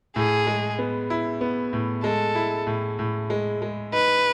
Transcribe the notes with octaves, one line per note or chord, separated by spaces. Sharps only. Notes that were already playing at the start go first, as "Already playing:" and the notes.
A2 G#4
G#3
B3
E4
B3
A2
G#3 A4
E4
A2
A2
G#3
G#3
D#4 B4